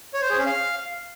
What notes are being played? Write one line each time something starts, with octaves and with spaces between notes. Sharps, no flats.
C#5
C5
G#4
C#4
F5